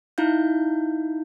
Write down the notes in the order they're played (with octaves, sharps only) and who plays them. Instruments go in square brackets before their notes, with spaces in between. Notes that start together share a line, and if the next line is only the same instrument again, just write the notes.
[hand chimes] D#4 E4 F5 G6